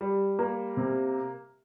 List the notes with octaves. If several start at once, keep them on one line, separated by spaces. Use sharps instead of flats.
G3
A#3
C3